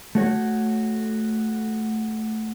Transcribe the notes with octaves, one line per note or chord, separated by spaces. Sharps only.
A3 F#4 C#5